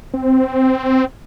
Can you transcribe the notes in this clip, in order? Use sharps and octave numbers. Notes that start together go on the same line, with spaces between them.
C4